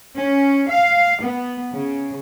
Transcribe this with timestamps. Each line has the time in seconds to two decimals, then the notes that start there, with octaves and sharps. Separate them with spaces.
0.16 C#4
0.71 F5
1.23 B3
1.74 C#3